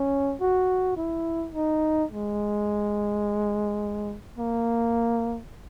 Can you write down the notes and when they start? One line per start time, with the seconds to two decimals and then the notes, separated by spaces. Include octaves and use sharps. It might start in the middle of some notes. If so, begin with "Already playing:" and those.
Already playing: C#4
0.40 F#4
0.96 E4
1.54 D#4
2.11 G#3
4.38 A#3